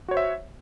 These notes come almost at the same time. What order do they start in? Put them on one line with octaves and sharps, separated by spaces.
F#4 C#5 C5 E5